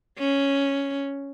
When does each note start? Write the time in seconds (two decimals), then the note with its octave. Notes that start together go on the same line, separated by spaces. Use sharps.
0.19 C#4